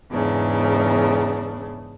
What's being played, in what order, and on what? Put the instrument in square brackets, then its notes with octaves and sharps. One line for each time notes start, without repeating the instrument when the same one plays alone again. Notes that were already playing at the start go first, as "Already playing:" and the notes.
[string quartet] E2 G#2 C#3 D4